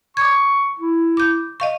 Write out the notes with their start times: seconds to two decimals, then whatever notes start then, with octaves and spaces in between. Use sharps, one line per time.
0.17 C#6 D6 G#6
0.79 E4
1.17 D6 G6
1.60 D#5 F5 C#6